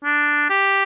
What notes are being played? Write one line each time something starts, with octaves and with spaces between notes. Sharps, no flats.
D4
G4